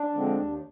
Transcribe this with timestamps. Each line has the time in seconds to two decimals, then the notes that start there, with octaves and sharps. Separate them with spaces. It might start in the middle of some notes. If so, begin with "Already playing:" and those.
Already playing: D4
0.14 D3 F3 G#3 C4
0.36 D#2